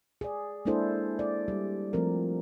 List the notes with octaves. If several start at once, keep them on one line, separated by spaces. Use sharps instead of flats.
G#4 D5
G#3 A#3 D4 E4 A4 C5
D5
G3
F3 A3 C4 A#4